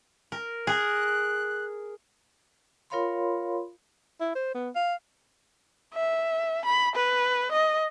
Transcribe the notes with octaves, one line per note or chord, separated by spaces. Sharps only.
A#4
G#4 A#4 F#6
F4 A#4 C#5 F5 B5 C6
E4
C5
B3
F5
E5
B5
B4
D#5